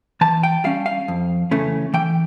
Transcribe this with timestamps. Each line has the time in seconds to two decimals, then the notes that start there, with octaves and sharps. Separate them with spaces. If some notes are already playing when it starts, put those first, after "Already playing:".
0.21 E3 A5
0.43 G5
0.64 G3 C#4 F5
0.86 F5
1.08 F2
1.51 C#3 E3 A3 C#4
1.94 E3 G5